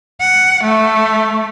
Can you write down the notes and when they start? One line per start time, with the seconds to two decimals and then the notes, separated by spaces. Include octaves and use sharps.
0.20 F#5
0.64 A3